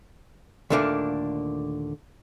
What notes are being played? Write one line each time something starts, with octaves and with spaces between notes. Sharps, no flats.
D#2 A#2 D3 A3 A#3 D4